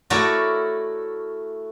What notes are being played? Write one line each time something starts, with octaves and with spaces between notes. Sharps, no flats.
A3 E4 F#4 A#4 C#5 D5